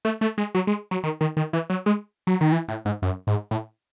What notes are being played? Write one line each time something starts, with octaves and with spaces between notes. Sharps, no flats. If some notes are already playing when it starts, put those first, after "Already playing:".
A3
A3
G#3
F#3
G#3
F#3
D#3
D#3
D#3
E3
F#3
G#3
F#3
D#3
E3
A2
G#2
F#2
G#2
A2